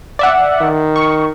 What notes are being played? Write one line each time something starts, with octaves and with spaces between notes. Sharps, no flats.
D5 E5 F#5
D#3
C#6